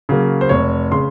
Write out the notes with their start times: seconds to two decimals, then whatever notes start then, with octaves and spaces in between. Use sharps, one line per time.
0.09 C#3 F#3 A#3
0.41 C5
0.49 F1 C#5
0.92 C#3 C6